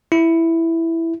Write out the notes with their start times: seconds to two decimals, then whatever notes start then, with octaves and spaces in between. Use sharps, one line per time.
0.12 E4